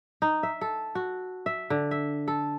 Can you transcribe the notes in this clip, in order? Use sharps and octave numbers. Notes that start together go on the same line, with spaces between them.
D#4
E5
A4
F#4
E5
D3
E5
A4